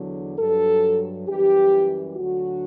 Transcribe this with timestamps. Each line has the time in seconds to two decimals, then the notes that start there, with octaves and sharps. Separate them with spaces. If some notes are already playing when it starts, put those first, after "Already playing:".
Already playing: E2 D3 F#3
0.38 G2 F#3 A4
1.28 F#2 E3 G3 G4
2.16 D2 D3 F#3 F#4